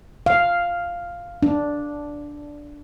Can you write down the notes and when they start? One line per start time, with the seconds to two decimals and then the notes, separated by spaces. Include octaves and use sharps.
0.26 F5
1.43 D4